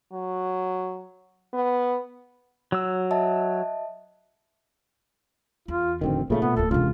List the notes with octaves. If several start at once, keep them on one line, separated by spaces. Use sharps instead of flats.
F#3
B3
F#3 E6
D#5 E5 A5
E2 F4
D1 D2 D#3 C4
A#2 C#3 A3 A#3 D#4
B2 B3
D1 E2 A4
E1 C#2 C3 D4 F4